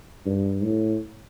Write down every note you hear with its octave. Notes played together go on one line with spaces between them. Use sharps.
G2
A2